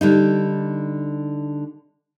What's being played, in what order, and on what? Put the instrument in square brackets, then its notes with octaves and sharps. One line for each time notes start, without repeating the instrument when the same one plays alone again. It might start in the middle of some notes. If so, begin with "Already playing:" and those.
[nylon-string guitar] D3 G3 D#4